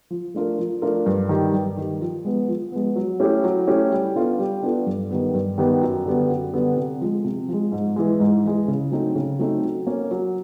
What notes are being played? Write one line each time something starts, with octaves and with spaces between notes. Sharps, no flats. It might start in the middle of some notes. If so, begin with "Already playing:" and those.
F3
A3 D4 F4 A#4
F3
A3 D4 F4 A#4
G2
D#3 G3
G2
D#3 G3
F3
G#3 B3
F3
G#3 B3
F#3
A3 C#4 E4 G4
F#3
A3 C#4 E4 G4
G3
B3 D4 F4 A4
G3
B3 D4 F4 A4
G2
D#3 G3 B3
G2
D#3 G3 B3
F#2
D3 G3 B3
F#2
D3 G3 B3
C3
F3 G#3
C3
F3 G#3
G#2
E3 G#3
G#2
E3 G#3
C#3
F#3 A3 C4 D#4
C#3
F#3 A3 C4 D#4
F#3
A#3 C#4
F#3